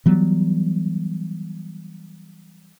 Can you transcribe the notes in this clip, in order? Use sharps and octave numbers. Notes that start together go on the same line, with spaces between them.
E3 F#3 G3 B3